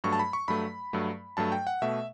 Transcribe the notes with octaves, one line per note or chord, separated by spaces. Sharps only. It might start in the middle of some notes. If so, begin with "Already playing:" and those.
G2 F#3 A3 C#6
A5
B5
C#6
G2 F#3 A3 B5
G2 F#3 A3
G2 F#3 A3 A5
G5
F#5
B2 A3 E5